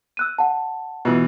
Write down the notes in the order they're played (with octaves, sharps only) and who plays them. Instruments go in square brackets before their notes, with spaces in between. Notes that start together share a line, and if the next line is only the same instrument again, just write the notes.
[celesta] E6 F#6 D#7
F#5 A5
[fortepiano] B2 E3